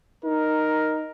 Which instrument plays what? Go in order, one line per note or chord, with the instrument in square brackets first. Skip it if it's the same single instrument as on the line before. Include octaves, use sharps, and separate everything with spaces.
[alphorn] D#4 [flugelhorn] A#4